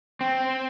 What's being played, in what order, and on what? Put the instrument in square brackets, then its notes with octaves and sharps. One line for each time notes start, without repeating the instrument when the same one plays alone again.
[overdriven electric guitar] C4